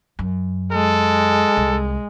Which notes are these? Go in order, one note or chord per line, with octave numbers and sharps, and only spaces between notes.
F#2
G#3 A4
C2